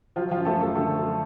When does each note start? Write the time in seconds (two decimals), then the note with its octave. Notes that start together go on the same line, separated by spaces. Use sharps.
0.16 F3 F#3 F4
0.31 F3 F4
0.37 F#2
0.45 A3 A4
0.56 F#2
0.61 A3 A4
0.75 D3 A3 A4
0.96 F#3